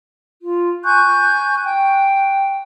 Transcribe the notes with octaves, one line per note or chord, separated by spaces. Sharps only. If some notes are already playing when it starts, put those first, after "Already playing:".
F4
G#5 C#6 F#6 G6
G5